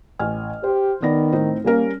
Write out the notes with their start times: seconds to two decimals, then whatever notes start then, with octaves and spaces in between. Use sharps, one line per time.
0.19 A1 G#5 F6
0.64 G4 C5
1.02 D#3 B3 D5 A#6
1.32 A2 C4 D#4
1.64 G3 A#3 C#4 A#4